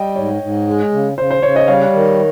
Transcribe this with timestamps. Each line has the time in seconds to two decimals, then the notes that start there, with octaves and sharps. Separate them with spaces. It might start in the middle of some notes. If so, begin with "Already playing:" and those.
Already playing: G3 D#5 G5
0.16 G#2 C#5
0.42 G#2
0.67 G#3
0.92 C#3
1.18 C#3 C5
1.31 C5
1.43 C#3 C#5
1.55 C5 D#5
1.67 G3 C#5 F5
1.93 D#3